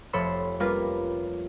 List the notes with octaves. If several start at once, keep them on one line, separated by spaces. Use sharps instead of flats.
F1 A4 C#5 B5 C6 E6
G3 A#3 C#4 F4 A#4 B4